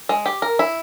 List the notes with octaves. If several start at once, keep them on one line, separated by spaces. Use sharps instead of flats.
G#3
G4
A#4
E4